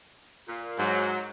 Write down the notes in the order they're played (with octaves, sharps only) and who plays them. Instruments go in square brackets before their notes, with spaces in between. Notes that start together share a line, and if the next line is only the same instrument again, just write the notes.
[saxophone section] A#2
[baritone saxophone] G#2 [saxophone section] F#3